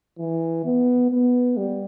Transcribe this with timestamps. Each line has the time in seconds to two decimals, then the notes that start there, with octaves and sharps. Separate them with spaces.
0.19 E3
0.65 B3
1.11 B3
1.57 G3